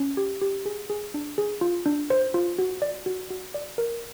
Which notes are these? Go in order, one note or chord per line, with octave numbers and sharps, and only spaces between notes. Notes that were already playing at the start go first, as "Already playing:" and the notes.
Already playing: C#4
G4
G4
G#4
G#4
D4
G#4
F4
D4
C5
F4
F#4
D5
F#4
F#4
D5
A#4